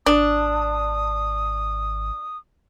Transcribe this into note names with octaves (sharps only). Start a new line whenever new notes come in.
G#1 D4 D#6